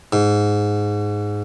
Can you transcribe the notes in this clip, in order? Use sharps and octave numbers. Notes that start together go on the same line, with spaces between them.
G#2